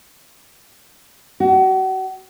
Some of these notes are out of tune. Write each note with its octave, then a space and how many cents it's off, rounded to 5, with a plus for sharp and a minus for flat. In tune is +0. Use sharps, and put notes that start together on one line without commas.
F#4 +35